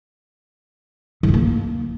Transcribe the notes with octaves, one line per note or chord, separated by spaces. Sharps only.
D#3
E3
A#3